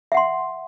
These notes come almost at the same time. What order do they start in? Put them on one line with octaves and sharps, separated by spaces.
E5 F#5 C6